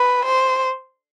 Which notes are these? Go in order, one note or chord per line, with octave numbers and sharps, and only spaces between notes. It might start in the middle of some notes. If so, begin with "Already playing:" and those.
Already playing: B4
C5